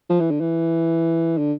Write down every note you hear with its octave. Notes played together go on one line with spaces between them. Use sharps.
F3
E3
D3
E3
D3